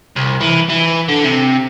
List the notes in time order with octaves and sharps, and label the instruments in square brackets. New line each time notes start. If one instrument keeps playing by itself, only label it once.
[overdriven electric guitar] C2
E3
E3
D3
C3